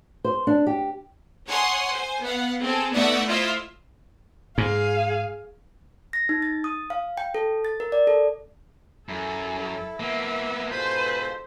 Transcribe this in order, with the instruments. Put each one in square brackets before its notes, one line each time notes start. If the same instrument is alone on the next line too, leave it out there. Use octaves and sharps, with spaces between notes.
[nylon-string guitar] C5
D4
G4
[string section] C#5 F#5 G#5 C6 D#6
C5 G#5
B3 F5 F#5
C4 G#4 A4
A3 B3 D#4 D5 E5 F#5
E4 F4 C5 D#5 E5
[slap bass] G#2 [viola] G#4 F5
[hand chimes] A#6
D#4
A6
D#6
F5
G5
A4
A6
A#4
D5
A4
[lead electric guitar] F#2 [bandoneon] E4 [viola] A4
[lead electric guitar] A#3 B3 [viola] E5
[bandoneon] G#2 B2 F4 [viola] A4 C5 [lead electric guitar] B4